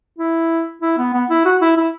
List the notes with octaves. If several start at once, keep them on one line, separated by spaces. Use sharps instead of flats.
E4
E4
B3
B3
E4
F#4
E4
E4